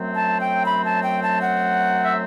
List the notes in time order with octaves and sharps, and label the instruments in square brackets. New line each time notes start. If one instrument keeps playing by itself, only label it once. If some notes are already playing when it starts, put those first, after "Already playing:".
Already playing: [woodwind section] F#2 F#3 A3 C4
A5
G5
B5
A5
G5
A5
F#5
E5